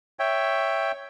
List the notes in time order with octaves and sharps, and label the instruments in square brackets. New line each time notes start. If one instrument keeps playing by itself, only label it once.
[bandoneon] C#5 E5 G5